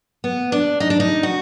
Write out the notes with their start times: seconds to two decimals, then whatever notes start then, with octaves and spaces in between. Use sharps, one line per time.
0.24 B3
0.52 D4
0.80 D#4
0.90 D4
1.00 D#4
1.23 F#4